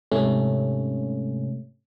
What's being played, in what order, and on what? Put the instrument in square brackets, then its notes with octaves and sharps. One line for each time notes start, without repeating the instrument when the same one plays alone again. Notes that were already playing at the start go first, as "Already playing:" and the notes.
[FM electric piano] G#2 C3 A3 C#4